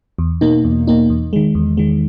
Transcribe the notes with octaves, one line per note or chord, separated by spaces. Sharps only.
E2
B2 A#3 D#4
E2
B2 A#3 D#4
E2
D#3 G#3
E2
D#3 G#3